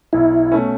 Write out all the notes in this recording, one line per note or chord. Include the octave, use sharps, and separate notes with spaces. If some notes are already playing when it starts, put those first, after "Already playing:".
B1 E4
B2 A3 C#4